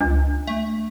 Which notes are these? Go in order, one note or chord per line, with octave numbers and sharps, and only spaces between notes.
C#2 D4
A3